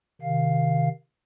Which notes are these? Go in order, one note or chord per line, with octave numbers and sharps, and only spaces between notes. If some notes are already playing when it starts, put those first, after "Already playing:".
C3 D#3 F5